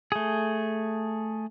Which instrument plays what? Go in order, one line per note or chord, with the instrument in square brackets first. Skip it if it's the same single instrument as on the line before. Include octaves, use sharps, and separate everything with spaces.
[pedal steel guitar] A3 G#4